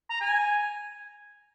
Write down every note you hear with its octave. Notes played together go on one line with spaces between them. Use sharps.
A#5
G#5